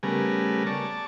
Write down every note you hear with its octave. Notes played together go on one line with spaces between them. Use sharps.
C#3 G3 A3 B3 A#4 G#5
D5 A5 C#6